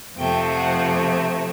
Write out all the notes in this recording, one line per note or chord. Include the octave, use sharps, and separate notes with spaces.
F2 C3 F3 A3 G5
F#5